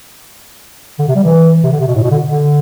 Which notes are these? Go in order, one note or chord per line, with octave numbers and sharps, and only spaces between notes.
D3
C3
G3
E3
C3
D3
C3
B2
A2
B2
D3
D3